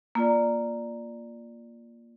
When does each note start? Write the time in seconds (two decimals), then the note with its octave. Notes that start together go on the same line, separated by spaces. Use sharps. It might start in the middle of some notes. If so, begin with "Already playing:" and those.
0.15 A#3 F4 D5